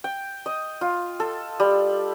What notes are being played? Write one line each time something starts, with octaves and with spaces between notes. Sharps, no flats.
G5
D#5
F4
A4
G3